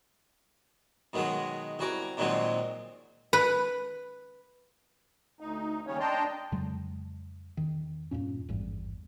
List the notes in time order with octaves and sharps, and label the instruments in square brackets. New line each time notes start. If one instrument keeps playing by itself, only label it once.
[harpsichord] B2 D#3 F#3 G#3 G#4
C2 F#4 G#5 A#5 D6
A#2 D#3 F3 F#3 G#3 C4
[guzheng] B4
[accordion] D2 D#4
D#2 C#3 G3 C#4 C#5
D4 D#5 G5 A5 A#5 C6
[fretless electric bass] F2 C#3 F#3 G#3
E2 D#3
E2 G2 A#2 C#4
G#1 E2 G2